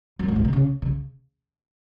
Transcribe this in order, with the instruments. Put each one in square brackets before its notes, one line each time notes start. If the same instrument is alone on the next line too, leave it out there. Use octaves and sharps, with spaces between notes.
[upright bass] F#2
G#2
A2
B2
C#3
C#3